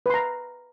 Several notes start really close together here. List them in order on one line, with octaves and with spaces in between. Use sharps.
B4 C6 A#5